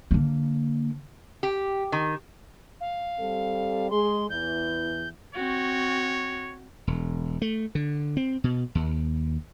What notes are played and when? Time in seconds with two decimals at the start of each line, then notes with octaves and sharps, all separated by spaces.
0.11 D3 A#3
1.43 G4
1.92 D#3
2.81 F5
3.19 G3 C4 A4
3.90 G#3 G#4 C6
4.30 E2 E3 G6
5.35 C4 F#4 C#5
6.87 E1
7.42 A3
7.75 D3
8.17 C4
8.44 B2
8.75 D#2